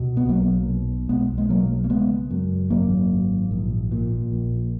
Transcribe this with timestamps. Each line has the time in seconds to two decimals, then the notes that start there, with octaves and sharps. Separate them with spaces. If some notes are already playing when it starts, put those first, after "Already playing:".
Already playing: C#2 B2
0.17 B3
0.29 B1 F#3 A#3
0.69 B2
1.09 B1 G#3 B3
1.38 G#3
1.49 B2 F#3 A#3
1.84 A#3
1.90 C#3 G#3 B3
2.31 F#2
2.70 G#1 F#3 A#3
3.11 G#1
3.51 A#1
3.92 A#2
4.32 A#1